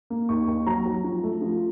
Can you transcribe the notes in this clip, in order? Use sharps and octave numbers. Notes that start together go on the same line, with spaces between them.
A#3
D#2 C#6
D#2
F#3 A#5
F#3
F3
A3
F3